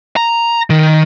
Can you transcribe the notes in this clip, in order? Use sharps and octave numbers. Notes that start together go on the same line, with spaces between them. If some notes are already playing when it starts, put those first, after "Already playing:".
A#5
D#3